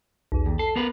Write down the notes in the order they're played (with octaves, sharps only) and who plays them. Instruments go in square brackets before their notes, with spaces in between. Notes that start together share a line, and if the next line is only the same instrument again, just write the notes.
[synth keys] B1 E2
[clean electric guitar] D#2
[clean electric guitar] A4 [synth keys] C7
[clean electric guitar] B3 A#4 B4